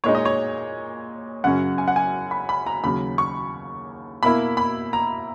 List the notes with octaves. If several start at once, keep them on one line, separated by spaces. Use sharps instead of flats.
A#2 G#3 D#4 C#5
D#5
C#5
F#2 C#3 F#3 C#4 F#5
G#5
F#5
G#5
B5
B5
A#5
D#2 C#3 F#3 B5
C#6
B2 A#3 E4 B5
B5
A#5